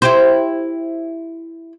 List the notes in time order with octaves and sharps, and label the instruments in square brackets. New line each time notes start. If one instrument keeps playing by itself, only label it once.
[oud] E4 G4 C5